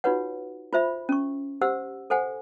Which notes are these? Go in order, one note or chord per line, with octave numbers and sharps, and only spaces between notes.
D#4 F4 F#4 B4 C#5 F#5
F4 C5 E5 B5
C#4 C#6
G4 C5 F#5 E6
A4 C5 F#5 G#5